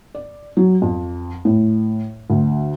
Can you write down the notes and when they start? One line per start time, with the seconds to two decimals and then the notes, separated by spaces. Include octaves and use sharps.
0.15 D5
0.57 F#3
0.82 F2
1.45 A2
2.30 D2